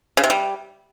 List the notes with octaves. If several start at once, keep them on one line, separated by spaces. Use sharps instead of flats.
C#3
C3
G3